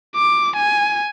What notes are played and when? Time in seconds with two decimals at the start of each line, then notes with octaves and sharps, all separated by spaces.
0.16 D6
0.56 G#5